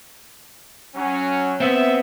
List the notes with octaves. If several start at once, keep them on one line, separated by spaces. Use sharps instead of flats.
F#3 C#4
B3 C4 E5